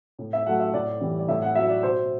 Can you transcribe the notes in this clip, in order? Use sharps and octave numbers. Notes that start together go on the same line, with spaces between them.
A2
E5
F#3 A3 F#5
E5
A2 D5
E3 G3
D5
A2 E5
F#5
F#3 A3 E5
D5
B2 C5